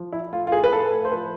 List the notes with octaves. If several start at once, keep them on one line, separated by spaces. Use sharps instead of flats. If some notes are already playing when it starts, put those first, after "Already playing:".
Already playing: F3
E4
A2 F4
F4
G#4
B4
A2 A4
C5
F3 B4